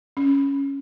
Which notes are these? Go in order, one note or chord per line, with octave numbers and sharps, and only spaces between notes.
C#4